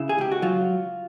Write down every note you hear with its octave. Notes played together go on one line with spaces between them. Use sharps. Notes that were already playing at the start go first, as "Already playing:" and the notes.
Already playing: C#3 E4
G#4
C#2 G4
F#4
F#3 F4